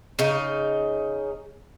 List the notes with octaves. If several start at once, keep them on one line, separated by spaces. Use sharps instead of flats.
C#3 D#4